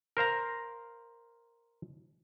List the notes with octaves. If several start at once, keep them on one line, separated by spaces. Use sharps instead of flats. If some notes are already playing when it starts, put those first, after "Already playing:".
A#4 C5 F5 A#5